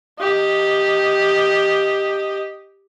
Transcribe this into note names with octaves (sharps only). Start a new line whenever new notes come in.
G4 D#5